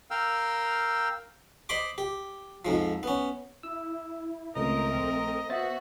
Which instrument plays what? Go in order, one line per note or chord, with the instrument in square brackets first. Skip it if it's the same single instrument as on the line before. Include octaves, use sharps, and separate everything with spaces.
[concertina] A#4 F5 G5 E6
[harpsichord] C5 D#5 B5 C6 D6
G4
F2 G#2 F3
B3 C#4
[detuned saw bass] E4 [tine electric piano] E6
[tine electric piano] G#1 C#2 A#5 [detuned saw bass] A3 [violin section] C4 A#4 [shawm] D#5
[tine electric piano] A#1
[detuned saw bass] B3 [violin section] F#4 [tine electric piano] C5 E5 A6